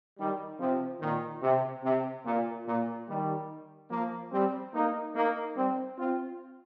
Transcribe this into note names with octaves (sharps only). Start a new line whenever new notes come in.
D#3 G3
C3 F3
A#2 D#3
C3
C3
A#2
A#2
D#3 G3
F3 A#3
G3 C4
A#3 D#4
A#3 D#4
G3 C4
C4 F4